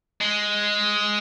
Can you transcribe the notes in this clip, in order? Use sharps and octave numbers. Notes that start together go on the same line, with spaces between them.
G#3